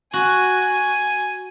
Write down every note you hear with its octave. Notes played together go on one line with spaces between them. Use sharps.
F#4 G#5